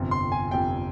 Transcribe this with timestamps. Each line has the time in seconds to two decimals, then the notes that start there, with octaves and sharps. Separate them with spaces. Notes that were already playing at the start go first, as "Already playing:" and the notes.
Already playing: G1 F2 C3 F3
0.11 C6
0.32 G#5
0.51 G1 F2 C3 F3 G5